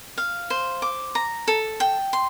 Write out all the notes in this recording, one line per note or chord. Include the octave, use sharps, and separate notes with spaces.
F5
C5
D6
A#5
A4
G5
C6